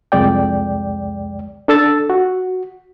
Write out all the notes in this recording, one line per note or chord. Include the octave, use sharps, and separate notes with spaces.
C2 F2 G#3 D5 G5
D4 A4 E6 A6
F#4